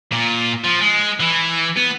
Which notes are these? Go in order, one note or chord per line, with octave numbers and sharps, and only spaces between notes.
A#2
F3
G#3
E3
B3